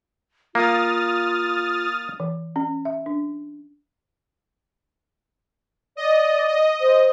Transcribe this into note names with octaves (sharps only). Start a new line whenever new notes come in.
A#3 F4 D#6 F6 A6
E3
C#4
E5
D4
D5 D#5
D#5
C5